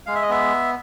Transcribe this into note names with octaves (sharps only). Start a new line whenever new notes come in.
G#3 F5
E5
D#5
B3 E5